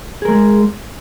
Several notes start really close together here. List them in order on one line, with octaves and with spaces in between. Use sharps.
G#4 A#4 G#3